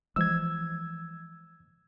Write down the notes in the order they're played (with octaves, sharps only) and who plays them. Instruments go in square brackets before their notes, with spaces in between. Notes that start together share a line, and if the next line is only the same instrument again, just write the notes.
[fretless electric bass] E3 F3 G#3 [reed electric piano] E6 G#6